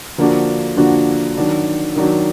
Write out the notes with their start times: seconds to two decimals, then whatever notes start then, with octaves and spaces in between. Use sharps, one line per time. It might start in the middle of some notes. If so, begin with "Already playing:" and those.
0.18 D3 F3 A#3 D4 F#4
0.77 D3 F3 A#3 D4 F#4
1.37 D#3 F#3 D4
1.96 D#3 F#3 D4